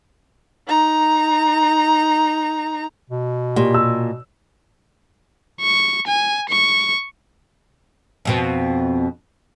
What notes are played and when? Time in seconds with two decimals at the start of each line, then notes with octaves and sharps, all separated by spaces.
0.67 D#4 A#5
3.10 B2
3.56 A#2 G4
3.74 E6
5.61 C#6
6.08 G#5
6.49 C#6
8.25 F2 B2 C4